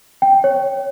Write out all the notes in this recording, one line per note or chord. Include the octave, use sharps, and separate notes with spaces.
G5
C#5